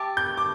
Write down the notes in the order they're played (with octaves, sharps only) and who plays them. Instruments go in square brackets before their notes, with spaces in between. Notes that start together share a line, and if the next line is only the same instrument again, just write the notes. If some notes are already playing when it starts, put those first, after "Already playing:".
Already playing: [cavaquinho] G4 E5 A5 [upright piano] D6
[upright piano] G6
D6